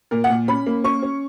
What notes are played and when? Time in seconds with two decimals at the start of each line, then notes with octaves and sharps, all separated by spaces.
0.11 A#2 A#4
0.24 F#5
0.30 A#2
0.48 C#4 B5
0.66 A#3
0.84 C#4 C#6
1.02 C#4